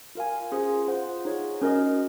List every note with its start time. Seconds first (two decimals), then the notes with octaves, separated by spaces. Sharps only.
0.15 F4 A#4 F5 G#5
0.52 C#4 F4 G#4 C5
0.88 F4 C5 F#5
1.25 D#4 G#4 C#5
1.62 C#4 F#4 A#4 D#5